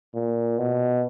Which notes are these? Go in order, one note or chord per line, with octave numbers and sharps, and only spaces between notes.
A#2
B2